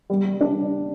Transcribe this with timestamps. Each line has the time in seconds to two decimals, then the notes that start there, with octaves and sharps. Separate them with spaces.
0.10 G3
0.25 G3
0.41 D4